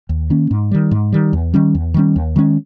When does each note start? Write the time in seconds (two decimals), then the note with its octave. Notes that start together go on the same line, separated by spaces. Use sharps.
0.09 D#2
0.30 D#3 A#3 C#4
0.51 G#2
0.71 D#3 G3
0.91 G#2
1.13 D#3 G3
1.33 E2
1.54 D#3 G3 C#4
1.75 E2
1.94 D#3 G3 C#4
2.16 D#2
2.36 D#3 G#3 C#4